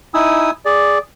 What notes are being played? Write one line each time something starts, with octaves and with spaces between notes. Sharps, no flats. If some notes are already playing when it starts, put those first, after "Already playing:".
D#4 E4 G#5 D#6 E6
G#4 D5